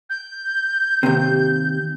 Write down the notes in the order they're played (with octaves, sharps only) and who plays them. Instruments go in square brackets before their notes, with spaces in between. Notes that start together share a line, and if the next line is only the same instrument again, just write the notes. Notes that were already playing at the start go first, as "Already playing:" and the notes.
[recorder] G6
[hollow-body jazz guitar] D#2 C3